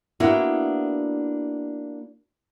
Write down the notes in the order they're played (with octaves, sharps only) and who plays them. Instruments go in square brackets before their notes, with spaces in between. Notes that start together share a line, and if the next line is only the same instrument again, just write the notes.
[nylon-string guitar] A#3 B3 D4 E4 F#4